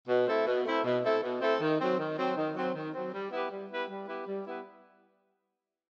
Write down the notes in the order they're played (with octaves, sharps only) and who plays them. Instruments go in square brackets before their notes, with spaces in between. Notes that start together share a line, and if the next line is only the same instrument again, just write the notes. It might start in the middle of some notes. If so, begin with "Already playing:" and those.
[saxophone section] B2
A3 C4 E4 A4
B2
A3 C4 E4 A4
B2
A3 C4 E4 A4
B2
A3 C4 E4 A4
D#3
F#3 C4
D#3
F#3 C4
D#3
F#3 C4
D#3
F#3 C4
G3
B3 E4 G4 B4
G3
B3 E4 G4 B4
G3
B3 E4 G4 B4
G3
B3 E4 G4 B4